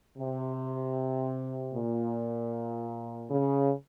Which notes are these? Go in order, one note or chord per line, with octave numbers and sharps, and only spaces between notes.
C3
A#2
C#3